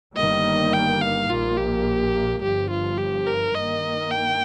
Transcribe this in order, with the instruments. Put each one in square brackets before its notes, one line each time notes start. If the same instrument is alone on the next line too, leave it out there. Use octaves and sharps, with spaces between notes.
[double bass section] G1 G2 D#3 G3 A#3 [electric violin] D#5
[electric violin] G5
F5
[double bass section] A#1 A#2 A#3 [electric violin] F4
[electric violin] G4
[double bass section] G1 G2 F3 [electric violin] G4
[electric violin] F4
G4
A#4
[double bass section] G2 D#3 A#3 [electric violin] D#5
[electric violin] G5